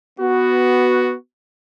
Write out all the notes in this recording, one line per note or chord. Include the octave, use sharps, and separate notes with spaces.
B3 F#4